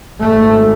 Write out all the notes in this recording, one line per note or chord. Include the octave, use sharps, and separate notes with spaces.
G#1 G#2 A3